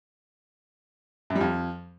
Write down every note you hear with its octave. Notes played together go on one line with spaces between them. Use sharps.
F#2
G3
F2